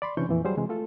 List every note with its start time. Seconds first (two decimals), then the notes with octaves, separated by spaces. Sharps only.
0.02 D5 B5 C6
0.17 C3 E3 C#4 D4 C#6 G6
0.29 F2 A#2 E3
0.45 F#3 G3 G#4 C5
0.57 C3 E3 G#3
0.69 A3 F4 A4